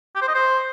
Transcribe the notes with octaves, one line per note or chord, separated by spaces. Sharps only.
G4
C5
D#5
C5